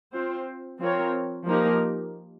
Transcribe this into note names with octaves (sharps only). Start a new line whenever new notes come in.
C4 F4 C5
F3 C4 F4 A#4 C#5
F3 A#3 D#4 G4 A#4